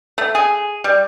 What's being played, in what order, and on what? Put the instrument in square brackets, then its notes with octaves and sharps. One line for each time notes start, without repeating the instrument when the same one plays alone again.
[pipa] A3
G#4
G3